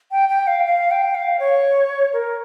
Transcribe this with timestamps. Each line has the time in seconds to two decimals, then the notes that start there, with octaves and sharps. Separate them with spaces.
0.11 G5
0.29 G5
0.47 F5
0.66 F5
0.91 G5
1.15 F5
1.40 C#5
2.13 A#4